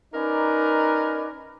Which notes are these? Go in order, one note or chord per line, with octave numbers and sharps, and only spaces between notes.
C#4 D#4 A#4 B4 D5